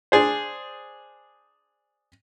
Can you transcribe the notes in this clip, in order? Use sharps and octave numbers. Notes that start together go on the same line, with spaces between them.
D4 G#4 C5